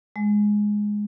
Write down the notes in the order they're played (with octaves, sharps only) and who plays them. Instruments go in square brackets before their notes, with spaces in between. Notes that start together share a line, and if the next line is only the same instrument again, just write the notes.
[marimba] G#3